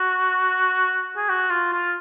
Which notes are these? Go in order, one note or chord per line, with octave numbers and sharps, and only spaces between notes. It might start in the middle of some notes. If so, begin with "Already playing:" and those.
Already playing: F#4
G#4
F#4
F4
F4